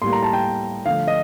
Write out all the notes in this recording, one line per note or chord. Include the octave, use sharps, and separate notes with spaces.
A2 G3 A#3 C6
A#5
A5
G5
D3 F3 A3 F5
D#5